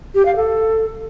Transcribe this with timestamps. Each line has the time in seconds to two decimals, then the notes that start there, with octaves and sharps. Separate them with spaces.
0.15 G4
0.25 F5
0.36 A4